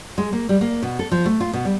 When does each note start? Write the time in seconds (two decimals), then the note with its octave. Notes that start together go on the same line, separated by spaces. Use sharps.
0.18 G#3
0.33 A#3
0.49 G3
0.61 A#3
0.83 B2
0.99 A4
1.12 F3
1.26 A3
1.40 F4
1.53 B2
1.65 G3